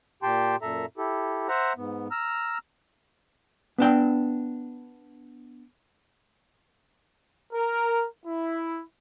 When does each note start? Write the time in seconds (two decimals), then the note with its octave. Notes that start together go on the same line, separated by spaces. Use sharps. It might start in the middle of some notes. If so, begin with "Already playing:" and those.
0.23 A#2 G4 G5 A5 C6
0.62 F#2 A#2 A4 E5 A#5
0.98 E4 G4 A4
1.48 C5 E5 F#5 A#5
1.77 G#2 B3
2.11 A#5 E6 F6
3.78 B3 D4 G5
7.53 A#4
8.26 E4